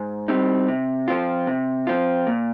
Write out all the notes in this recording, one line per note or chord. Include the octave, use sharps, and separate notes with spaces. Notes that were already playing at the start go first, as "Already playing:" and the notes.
Already playing: G#2
G3 C4 D#4
C3
F3 C4 F4
C3
F3 C4 F4
A#2